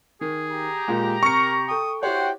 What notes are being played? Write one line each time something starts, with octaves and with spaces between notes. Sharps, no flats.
D#3 G#4
G4 A#5
A#2 G#3
C3 A#4 C#6 C#7
A4 G5 D#6
E4 F#4 G4 C5 C#5 F#5 G5